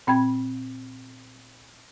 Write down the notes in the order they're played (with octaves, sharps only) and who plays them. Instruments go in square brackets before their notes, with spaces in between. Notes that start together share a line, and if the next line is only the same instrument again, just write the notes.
[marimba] A#2 C4 G5 B5 G#6